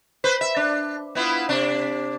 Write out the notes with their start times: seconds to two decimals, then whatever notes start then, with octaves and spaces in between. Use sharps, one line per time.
0.24 B4 C5
0.41 E5
0.56 D4
1.15 B3 E4 F4
1.49 C3 D4